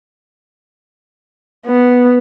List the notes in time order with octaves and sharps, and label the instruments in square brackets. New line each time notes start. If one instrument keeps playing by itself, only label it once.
[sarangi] B3